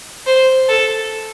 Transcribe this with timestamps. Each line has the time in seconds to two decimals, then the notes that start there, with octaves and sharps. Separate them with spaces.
0.27 C5
0.69 A4